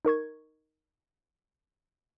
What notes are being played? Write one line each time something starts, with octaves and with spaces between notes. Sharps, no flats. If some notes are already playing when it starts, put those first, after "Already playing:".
D#4 A#4 C#6 G#6